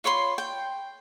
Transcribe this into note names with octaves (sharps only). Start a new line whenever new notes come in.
F4 C#5 B5 C6
G5